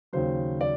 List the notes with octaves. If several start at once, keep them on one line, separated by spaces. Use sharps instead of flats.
D#2 C#3 F#3 C5
D5